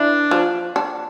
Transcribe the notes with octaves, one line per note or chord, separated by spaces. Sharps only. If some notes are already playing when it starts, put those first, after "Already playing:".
Already playing: E3 D4
F3
D4